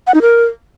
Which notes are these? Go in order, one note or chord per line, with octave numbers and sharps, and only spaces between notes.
F#5
D#4
A#4